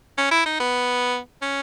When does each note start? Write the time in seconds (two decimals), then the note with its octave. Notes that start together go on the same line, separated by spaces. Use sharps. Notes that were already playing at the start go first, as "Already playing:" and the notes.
0.18 C#4
0.32 E4
0.46 D#4
0.60 B3
1.42 C#4